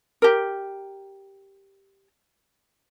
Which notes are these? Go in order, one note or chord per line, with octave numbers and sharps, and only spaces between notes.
G4 A#4